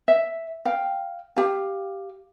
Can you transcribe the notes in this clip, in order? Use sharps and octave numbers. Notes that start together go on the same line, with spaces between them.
E5
F5 G5
G4 F5